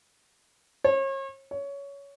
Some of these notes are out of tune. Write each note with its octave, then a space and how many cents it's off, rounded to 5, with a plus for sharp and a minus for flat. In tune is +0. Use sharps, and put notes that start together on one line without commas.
C#5 -40
C#5 +15